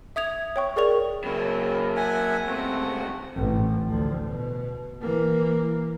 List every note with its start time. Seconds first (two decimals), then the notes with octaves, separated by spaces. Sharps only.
0.16 E5 D#6 G#6 F7
0.56 C#5 G5 C#6
0.76 G#4 A#4 D5 C#6 F7
1.24 C#3 F#3 A#3 C4 E4
1.96 E5 F#5 G#5
2.47 C2 C#3 A3 C4 F#5
3.35 A1 G#2
3.86 D2 F3
4.24 B2
5.02 E3 A#3